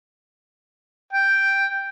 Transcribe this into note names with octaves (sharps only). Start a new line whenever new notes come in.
G5